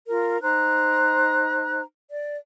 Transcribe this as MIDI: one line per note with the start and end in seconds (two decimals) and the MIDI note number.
0.09 0.41 65
0.09 0.41 70
0.43 1.82 63
0.43 1.82 72
0.43 1.82 82
0.43 1.82 90
2.11 2.36 74